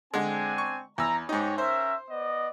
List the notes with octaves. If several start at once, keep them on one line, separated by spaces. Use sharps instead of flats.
D3 G#3 C4 D4 G#5
C#6
E2 A#5 E6
G#2 D#4 G4 C#5
C#4 A#4 C5 E5
B3 D5 D#5